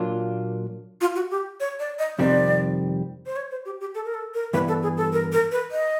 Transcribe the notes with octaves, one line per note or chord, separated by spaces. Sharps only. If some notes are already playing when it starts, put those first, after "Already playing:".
Already playing: A#2 F#3 A#3 D4 F4
F4
F#4
G4
C#5
D5
D#5
F2 C3 D#3 G3 C4 D5
C5
C#5
C5
G4
G4
A4
A#4
A4
A#4
G2 E3 G3 B3 B4
A4
G#4
A4
A#4
A#4
B4
D#5